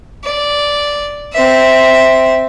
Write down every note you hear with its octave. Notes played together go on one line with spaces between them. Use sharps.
D5
C4 E5